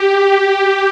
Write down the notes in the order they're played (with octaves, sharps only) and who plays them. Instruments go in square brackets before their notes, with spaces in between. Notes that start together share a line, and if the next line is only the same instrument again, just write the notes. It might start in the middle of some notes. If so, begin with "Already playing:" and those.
Already playing: [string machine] G4